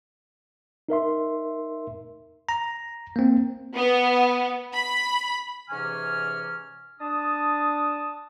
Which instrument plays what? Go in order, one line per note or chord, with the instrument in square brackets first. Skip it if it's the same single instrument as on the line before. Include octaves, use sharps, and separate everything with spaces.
[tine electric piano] D#4 A#4 E5 C6
A#5
A#3 C4
[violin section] B3
B5
[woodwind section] G#2 C3 E3 C#4 G#5 F6
D4 A5 D#6